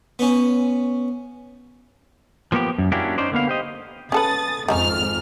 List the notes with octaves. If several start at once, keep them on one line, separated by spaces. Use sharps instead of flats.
B3 C#4
F3 A#3 B3 F#4 G4
F#2
A#3 C#4 D4 E4 F#4 G4
C#4 D#4 C5 D5
D3 A#3 B3 F5
G4 C5 D#5
C#4 A4 B4 D#6 A6
G#1 F2 D#3 C#4 D#4 F6